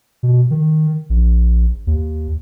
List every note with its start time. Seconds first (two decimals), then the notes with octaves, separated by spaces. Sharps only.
0.23 B2
0.51 D#3
1.10 A#1
1.87 D#2